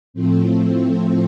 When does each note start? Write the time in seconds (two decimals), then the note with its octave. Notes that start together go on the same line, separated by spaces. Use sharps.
0.14 A2 F3 A3 C4
0.67 C4